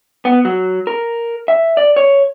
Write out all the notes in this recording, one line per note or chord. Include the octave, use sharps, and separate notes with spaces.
B3
F#3
A#4
E5
D5
C#5